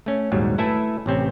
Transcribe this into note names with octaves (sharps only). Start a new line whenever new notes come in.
A3 C#4
A#1 D#2 G#2 F#3 G3
A3 E4 A4 B4 E5 G#5
A1 C3 C4 C#4